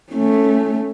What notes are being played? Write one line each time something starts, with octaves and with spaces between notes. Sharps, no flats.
A3 C#4